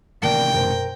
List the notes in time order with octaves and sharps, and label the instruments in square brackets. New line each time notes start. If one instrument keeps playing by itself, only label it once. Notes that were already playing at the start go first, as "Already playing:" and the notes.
[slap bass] A1 C3 D#3 [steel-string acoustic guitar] A#3 [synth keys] D5 A5 [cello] G5
[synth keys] F#2 B2 C5 [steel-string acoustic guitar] A#4